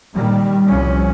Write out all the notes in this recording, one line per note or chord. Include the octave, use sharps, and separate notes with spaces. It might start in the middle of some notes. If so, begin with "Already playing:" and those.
A#2 D#3 G3
C2 F3 C#4